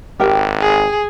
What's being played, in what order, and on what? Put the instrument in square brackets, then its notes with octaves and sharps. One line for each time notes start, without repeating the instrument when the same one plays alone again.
[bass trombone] G#1 [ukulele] G4 A#4 G5
[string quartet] G#4